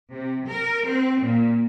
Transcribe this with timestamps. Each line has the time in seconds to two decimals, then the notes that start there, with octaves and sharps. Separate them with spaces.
0.13 C3
0.48 A#4
0.88 C4
1.24 A#2